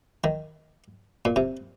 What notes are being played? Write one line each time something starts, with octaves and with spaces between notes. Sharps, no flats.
D#3
A#2
C3